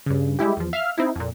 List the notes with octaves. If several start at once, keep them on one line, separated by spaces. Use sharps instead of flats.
G2 C#3
G3 G#3 E4 G4
E2 F3
E5 F5 F6
C4 D#4 E4
F2 A#2